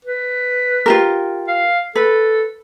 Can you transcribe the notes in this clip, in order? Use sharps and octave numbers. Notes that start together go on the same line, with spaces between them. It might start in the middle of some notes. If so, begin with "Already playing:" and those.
B4
F4 G4 A#4
F5
A4 B4